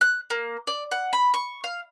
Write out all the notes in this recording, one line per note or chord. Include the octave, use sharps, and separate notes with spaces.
F#6
A#3
D5
F#5
B5
C#6
F5